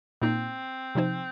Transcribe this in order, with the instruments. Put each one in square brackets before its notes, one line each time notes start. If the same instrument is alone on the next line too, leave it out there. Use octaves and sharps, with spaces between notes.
[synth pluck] A#2 A#3 D#4 [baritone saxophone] C4
[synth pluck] C3 F3 D#4 C5